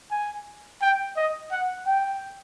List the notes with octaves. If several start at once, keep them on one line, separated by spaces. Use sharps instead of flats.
G#5
G5
D#5
F#5
G5